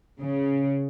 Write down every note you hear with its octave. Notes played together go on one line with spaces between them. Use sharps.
C#3